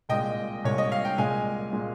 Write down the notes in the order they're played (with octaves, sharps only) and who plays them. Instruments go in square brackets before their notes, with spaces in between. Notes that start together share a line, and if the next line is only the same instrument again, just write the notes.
[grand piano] C2 A#2 G#3 [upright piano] D#5 G5
[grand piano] C2 A#2 G#3 [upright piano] C#5
[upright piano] D#5
F5
G5
[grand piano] C2 A#2 G#3 [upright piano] F5 G#5
[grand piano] A#2 G#3